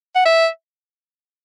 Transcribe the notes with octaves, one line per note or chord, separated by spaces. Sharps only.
F#5
E5